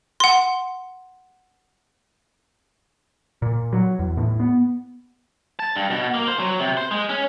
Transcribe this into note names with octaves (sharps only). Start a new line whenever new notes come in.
F#5 C6
A#2
F#3
E2
A2
B3
A5
G2
B2
A#3
C5
F#3
C3
C5
G#3
C#4